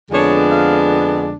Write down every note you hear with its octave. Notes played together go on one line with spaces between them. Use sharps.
F2 D3 G#3 B3 D4 C#5
F5